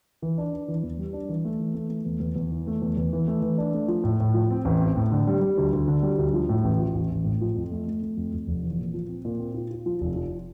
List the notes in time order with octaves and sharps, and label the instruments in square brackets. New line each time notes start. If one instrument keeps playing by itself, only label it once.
[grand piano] E3
D4
D4
E3
E2
G3
D4
E3
A3
E3
A3
A3
E2
E2
E2
E3
A3
E2
E2
E3
A3
E3
D4
A3
F3
A2
A2
F3
C4
A1
C4
A2
D3
G3
G3
D2
D2
D3
G3
D2
F3
A2
A1
F3
A1
A1
A2
F3
F2
A3
A3
A3
F2
F2
F1
E3
A#2
F3
C4
A#2
C4
F4
F4
F3
F1
F3